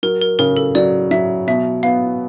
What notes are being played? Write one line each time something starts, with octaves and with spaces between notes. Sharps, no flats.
F#3 A#4
A#4
C#3 A#4
A4
F#3 D5
F#3 E5
B2 E5
B3 F5